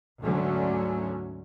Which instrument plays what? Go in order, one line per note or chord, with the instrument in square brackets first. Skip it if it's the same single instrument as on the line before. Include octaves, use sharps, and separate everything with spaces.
[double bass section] D2 G#2 D3 F#3 A3 C#4